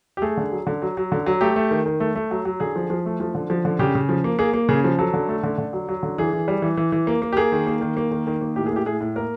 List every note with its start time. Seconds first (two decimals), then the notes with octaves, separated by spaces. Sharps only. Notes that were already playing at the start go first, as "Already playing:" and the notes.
0.17 G4
0.22 A3 G#4
0.37 D3
0.51 F#3
0.67 D3
0.82 F#3
0.97 F#3
1.12 D3
1.26 F#3
1.41 A3 G4
1.56 A3
1.71 D#3
1.86 D#3
2.00 A3
2.15 A3
2.31 F#3
2.45 F#3
2.60 D3 G#4
2.76 F3
2.90 F3
3.06 A3
3.20 F3
3.35 D3
3.50 F3
3.65 D3
3.79 C#3 G4
3.95 C#3
4.09 F3
4.24 A#3
4.39 A#3 G#4
4.54 A#3
4.69 C#3 G#4
4.84 F3
4.99 F#3 A4
5.14 D3
5.28 A3
5.43 D3
5.58 D3
5.73 F#3
5.89 F#3
6.03 D3
6.18 E3 G#4
6.33 E3
6.48 G3
6.62 E3
6.77 E3
6.92 E3
7.07 A#3
7.22 A#3
7.33 G4
7.37 A#3 G#4
7.52 D#3
7.67 A#3
7.81 D#3
7.97 A#3
8.11 D#3
8.27 D#3
8.41 A#3
8.56 A2 G4
8.66 G#4
8.71 A2
8.76 G4
8.86 A2 G#4
9.01 A2
9.16 A#3 A#4